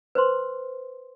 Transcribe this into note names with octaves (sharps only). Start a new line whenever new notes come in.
B4 C5 C6